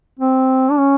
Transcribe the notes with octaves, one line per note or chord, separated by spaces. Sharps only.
C4
D4
C#4